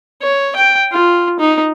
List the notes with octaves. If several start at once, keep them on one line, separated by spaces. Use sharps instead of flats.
C#5
G5
F4
D#4